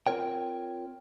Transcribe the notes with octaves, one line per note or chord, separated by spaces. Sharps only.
C4 F4 A#4 C#5 G5